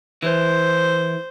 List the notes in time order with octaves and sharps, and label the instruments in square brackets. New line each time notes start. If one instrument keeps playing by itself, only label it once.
[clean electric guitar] E3 [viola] C5